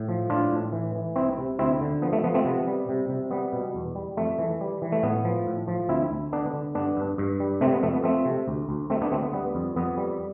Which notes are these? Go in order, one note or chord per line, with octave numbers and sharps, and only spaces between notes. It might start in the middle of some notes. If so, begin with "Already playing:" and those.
Already playing: A2
F3
A2 D4 F4
A2
E3
E3
C2 C4 E4
C3
D2 C4 E4
D3
F3 B3
A3
F3 B3
A3 C4
C3 B3
G3
C3
C3
G3 B3
B2
E2
G3
F2 A3
E3
G3
E3
A3
A2 B3
F3
A2
F3
D2 C4 E4
D2
D3 B3 D4
D3
G2 B3 D4
G2
G2
G3
C3 A3 C4
B3
F2 A3
B3
F3 A3 C4
C3
D2
D2
D2 A3 C4
B3 D4
D2 A3 C4
B3
G3 B3
F2
F2 B3
G3